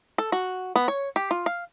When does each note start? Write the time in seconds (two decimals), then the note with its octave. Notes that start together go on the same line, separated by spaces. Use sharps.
0.18 A4
0.32 F#4
0.76 B3
0.88 C#5
1.16 G4
1.31 F4
1.46 F5